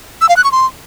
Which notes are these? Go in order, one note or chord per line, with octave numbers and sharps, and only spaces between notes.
E6
F5
F#6
C#6
C6